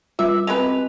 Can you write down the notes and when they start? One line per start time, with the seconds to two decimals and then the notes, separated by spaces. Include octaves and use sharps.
0.19 G3 F4 E5
0.47 G#3 C4 G4 B4 F7